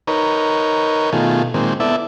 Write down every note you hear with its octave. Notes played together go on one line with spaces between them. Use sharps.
D#4 A#4 B4 C#5
B2 D#3 A3 F4 G#4
A#2 D#3 G#3 C4
B3 E4 A4 D5 E5